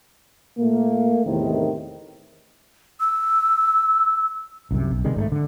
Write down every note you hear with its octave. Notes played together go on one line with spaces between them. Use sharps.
A#2 A3 A#3
E2 A2 C3 D#3
E6
C2 F#2 C3
B1
C3 D#3 G3 G#3
G#2 G3 A3
D3